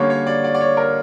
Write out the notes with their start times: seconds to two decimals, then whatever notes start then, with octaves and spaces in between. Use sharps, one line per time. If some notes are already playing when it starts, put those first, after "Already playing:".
Already playing: D3 G3 A#3 C#4 C#5
0.10 C#5
0.27 D5
0.44 D5
0.54 D5
0.61 C#5
0.77 A#4